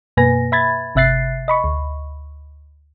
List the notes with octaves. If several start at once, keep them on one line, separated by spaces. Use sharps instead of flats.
F#2 B2 A#3 B4 G#5 A#6
E5 B5 G#6 A6
G1 C3 E5 F#6 A6 C7
D#5 B5 C#6
D2